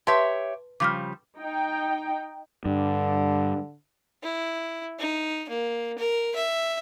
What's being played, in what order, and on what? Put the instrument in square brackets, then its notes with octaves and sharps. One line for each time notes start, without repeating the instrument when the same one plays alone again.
[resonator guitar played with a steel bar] G4 C#5 E5 [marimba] B4 A5 C6
[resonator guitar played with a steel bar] C#3 F3 G3 [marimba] D6 F6
[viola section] D#4 G5
[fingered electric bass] G2 [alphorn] D3
[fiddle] E4
D#4
A#3
A#4
E5